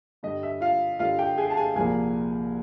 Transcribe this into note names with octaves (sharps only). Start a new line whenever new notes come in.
G2 D3 G3 D#5
E5
F4 F5
G2 D3 G3 F4 F5
G4 G5
G#4 G#5
A5
G#4 G#5
C2 A#2 F3 A#3 G#4 G#5